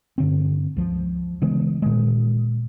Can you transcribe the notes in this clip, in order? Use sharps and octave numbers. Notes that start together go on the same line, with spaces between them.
G2 D3 C4
C#2 F3
C#3 E3 G#3 B3
A#2 D#3 G#3